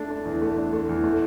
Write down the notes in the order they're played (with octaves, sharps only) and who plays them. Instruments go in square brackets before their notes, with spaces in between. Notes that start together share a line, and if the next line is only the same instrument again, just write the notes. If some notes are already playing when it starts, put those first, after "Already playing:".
Already playing: [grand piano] A3 D4
D4
E2
A3
D4
A3
E2
A3